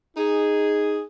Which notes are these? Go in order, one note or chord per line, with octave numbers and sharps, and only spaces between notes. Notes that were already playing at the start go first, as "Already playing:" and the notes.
D#4 G#4